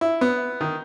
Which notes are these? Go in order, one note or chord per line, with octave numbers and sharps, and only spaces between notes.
E4
B3
D#3